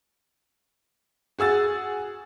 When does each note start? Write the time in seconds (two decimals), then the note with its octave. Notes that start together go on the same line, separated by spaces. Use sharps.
1.39 F#4 G#4 E6 A6